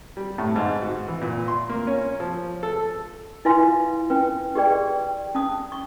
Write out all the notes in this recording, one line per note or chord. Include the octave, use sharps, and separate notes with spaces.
G3
A2
G#2
F#4
E3
A#2
C6
A#3
C#4
F3
A4
E4 F4 B4 F5 G#5 C6
C#4 B4 G5
G4 G#4 B4 D5 G5
C#4 A5 D#6
C#6